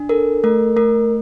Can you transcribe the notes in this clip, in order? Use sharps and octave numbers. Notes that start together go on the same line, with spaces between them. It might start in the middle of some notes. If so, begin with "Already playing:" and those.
Already playing: D4
A4 A#4
A3 A#4
A3 A#4